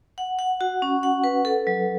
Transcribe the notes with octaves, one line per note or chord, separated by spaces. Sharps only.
F#5
F#5
F#4
C#4
F#5
B4
A4
F#3